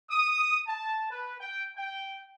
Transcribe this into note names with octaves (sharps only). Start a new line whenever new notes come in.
D#6
A5
B4
G5
G5